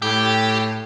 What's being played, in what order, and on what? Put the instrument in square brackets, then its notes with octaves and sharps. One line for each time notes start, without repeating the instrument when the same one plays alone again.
[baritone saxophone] A2 [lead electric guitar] G4